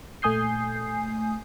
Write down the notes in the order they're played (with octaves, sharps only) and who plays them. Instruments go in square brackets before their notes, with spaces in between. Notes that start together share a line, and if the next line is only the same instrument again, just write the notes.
[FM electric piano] A#2 A3 G#5 D#6 G6 C7